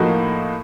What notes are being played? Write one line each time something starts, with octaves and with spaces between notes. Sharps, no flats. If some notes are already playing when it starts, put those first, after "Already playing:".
Already playing: A2 F3 A#3 D#4 F#4